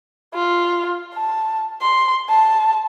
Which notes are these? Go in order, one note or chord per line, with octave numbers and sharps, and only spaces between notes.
F4
A5
C6
A5